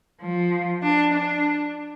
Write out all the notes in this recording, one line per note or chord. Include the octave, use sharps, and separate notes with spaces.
F3
D4
D4